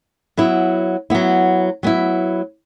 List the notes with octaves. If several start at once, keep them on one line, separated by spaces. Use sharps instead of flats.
F#3 B3 E4
F#3 B3 E4
F#3 B3 E4